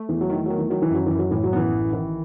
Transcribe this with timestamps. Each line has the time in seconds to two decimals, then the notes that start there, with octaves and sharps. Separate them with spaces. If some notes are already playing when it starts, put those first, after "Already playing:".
Already playing: A3
0.09 E2 E3
0.21 F#3
0.30 D#3 E3
0.46 D#3 F#3
0.58 E3
0.70 D#3 F#3
0.82 E3
0.91 F#2 F#3
1.06 F#2 E3
1.19 F#3
1.31 A2 E3
1.43 F#3
1.53 E3 B3
1.73 A1
1.93 D#3 E3